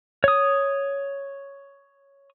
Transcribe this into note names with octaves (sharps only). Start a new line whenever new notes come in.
C#5 D#6